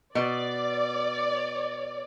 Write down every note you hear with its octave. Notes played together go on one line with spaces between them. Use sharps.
B2 D5